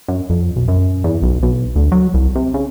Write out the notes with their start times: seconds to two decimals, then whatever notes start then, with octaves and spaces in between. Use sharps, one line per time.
0.08 F#2
0.30 F2
0.56 B1
0.68 F#2
1.04 E2
1.22 B1
1.43 B1
1.76 D2
1.92 F#3
2.14 C2
2.36 C3
2.54 C#3